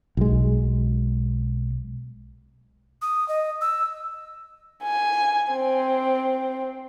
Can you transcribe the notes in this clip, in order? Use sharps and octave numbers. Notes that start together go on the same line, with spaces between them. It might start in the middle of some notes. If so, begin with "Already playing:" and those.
B1 G#3
D#6
D#5
E6
G#5
C4